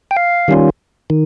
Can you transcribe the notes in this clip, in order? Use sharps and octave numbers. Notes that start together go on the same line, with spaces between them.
G5
F5
D#3 G3 C#4 F4
D#3